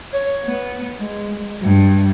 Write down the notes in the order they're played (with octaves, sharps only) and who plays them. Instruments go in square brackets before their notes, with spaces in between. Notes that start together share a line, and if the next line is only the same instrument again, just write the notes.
[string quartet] C#5
B3
G#3
G2